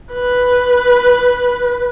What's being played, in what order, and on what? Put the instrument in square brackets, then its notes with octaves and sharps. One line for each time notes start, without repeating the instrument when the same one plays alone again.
[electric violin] B4